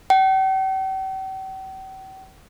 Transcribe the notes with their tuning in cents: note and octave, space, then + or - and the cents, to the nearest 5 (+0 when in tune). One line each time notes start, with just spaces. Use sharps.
G5 -45